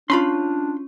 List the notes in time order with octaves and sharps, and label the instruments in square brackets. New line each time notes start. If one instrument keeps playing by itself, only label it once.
[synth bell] C#4 [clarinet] D4 [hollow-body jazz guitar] F4 B5 C6